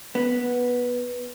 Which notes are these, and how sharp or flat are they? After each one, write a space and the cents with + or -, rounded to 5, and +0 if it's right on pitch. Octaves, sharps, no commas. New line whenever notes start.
B3 -10